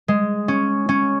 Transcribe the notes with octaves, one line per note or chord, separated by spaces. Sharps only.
G#3
C#4
C#4